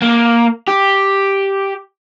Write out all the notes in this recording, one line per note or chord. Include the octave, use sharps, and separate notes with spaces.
A#3
G4